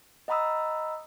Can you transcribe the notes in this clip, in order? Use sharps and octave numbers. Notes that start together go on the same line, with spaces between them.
D#5 F#5 A#5 B5 D#6 E6